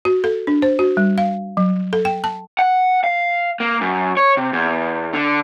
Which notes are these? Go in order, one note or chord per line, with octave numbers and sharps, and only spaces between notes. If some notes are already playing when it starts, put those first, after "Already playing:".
F#4
A4
D4
C5
F#4
G3
F5
F#3
A4
G5
A5
F#5
F5
A#3
F#2
C#5
C3
E2
D3